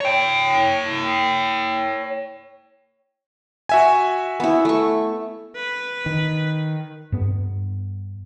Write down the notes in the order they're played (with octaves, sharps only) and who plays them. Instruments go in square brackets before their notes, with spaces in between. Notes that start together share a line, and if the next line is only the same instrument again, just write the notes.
[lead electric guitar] C#5 G5
[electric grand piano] F#4 E5 G#5
[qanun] B3 E4
A3 C#6
[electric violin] B4
[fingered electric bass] D#3
[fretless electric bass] G2 B3